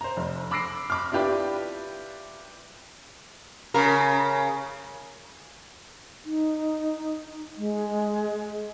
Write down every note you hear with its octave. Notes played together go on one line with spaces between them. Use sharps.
C5 A#5
F1
B5 D6 E6 A#6 C7 D7
B5 D6 F6
D4 E4 F4 G4 B4 D5
C#3 A#4
D#4
G#3